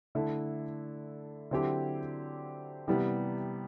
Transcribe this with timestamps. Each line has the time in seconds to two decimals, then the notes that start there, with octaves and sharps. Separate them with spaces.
0.15 D3 A3 E4 A4
1.51 D3 F#3 C4 E4 G4
2.88 C3 E3 G3 B3